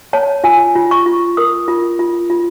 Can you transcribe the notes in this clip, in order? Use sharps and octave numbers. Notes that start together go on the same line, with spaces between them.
C#5 A5
F4 G#5
F4
C#6
F4
A#4 D#6
F4
F4
F4